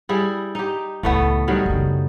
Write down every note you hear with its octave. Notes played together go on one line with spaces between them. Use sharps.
G3 E4 G#4
D#4 G4
C#2 A2 D#3 A3 B3
D#3 F#3 G3
F#2 C#3